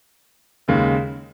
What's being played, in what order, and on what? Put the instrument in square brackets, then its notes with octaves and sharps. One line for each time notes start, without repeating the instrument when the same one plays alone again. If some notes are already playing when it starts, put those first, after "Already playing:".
[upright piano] D#2 C#3 G#3